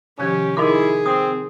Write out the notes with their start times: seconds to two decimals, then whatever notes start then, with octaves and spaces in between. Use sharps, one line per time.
0.19 C3 D#3 F3 C#4 G4
0.57 D#4 E4 G#4 A#4 D#5 C6 D6
1.06 C4 D#6